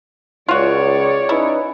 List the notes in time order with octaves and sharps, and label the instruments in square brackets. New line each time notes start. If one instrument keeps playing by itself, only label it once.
[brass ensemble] C#2 [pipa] F4 F#4 [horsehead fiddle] C#5 D5
[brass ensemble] C#4 D#4 B4 [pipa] E4